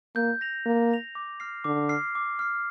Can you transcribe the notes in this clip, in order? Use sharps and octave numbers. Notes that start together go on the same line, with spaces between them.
A#3 G6
A#6 F7
A#3 G6
A#6 F7
D6
F6 C7
D3 D6
F6 C7
D6
F6 C7